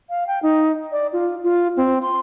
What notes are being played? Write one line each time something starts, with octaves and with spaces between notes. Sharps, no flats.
F5
G5
D#4
D5
F4
F4
C4
C6